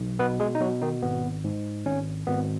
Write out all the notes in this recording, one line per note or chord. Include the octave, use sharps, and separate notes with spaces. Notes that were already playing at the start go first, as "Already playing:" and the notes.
Already playing: B1
B2 B3 B4
G#3 G#4
D#4
B2 F#3 F#4
D#3 D#4
G#1 B3
G#2
G#1 C#4
G#1 B3